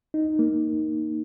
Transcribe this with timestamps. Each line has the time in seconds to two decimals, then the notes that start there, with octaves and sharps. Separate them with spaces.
0.14 D#4
0.39 A#3